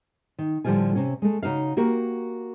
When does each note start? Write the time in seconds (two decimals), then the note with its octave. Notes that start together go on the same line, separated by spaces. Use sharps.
0.39 D#3
0.65 A2 D3 F3 G3 F4 G#5
0.95 C3 C#4
1.22 G#3 A3
1.43 C#3 D#4 F#4 F5
1.77 A#3 F#4 G4 A#4